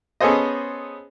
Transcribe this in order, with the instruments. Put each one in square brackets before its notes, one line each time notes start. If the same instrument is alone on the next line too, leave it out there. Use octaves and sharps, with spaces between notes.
[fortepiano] B3 C#4 G#4 A4 C5 D#5